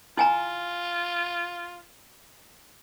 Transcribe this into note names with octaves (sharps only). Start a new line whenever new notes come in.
E4 F4 G#5 A#5